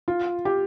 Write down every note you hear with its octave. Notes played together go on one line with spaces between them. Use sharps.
F4
G4